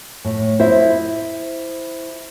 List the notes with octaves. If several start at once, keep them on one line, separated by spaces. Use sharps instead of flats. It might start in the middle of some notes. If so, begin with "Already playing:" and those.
A2
E4 C5 D#5 E5